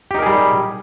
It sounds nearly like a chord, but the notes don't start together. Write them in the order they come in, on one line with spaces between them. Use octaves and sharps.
G4 D#4 A#4 G#4 G3